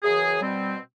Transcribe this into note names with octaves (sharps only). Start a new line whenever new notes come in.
F#2 C#3 E3 G#4
B2 G3 C4